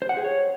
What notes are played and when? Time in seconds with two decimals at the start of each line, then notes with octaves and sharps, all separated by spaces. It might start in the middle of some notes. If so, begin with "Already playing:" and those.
0.02 C5
0.09 F#5
0.17 G#4
0.24 C#5